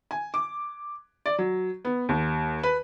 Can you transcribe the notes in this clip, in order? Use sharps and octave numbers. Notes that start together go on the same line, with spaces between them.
G#5
D6
D5
F#3
B3
D#2
B4